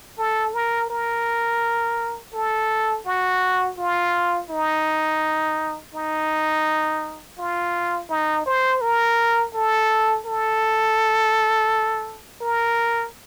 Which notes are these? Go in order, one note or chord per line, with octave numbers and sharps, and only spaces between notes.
A4
A#4
A#4
A4
F#4
F4
D#4
D#4
F4
D#4
C5
A#4
A4
A4
A#4